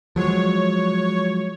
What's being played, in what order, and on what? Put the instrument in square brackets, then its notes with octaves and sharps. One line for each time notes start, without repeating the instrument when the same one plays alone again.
[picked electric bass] F3 F#3 G#3 [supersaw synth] C#5